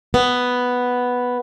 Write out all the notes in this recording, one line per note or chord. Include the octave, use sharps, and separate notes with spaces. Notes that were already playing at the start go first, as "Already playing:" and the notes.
B3